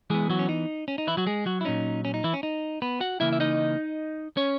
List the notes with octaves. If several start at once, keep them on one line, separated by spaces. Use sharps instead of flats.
E3 G#3 B3 G#4
F#3 F#4
C#4
D#4
C#4
D#4
E3 E4
F#3 F#4
G#3 G#4
F#3 F#4
E4
A#2 F#3 C#4 D#4
C#4
D#4
E3 E4
C#4
D#4
B3 B4
F#4 F#5
C#3 E3 A#3 E4 E5
E5
D#4 D#5
C#4 C#5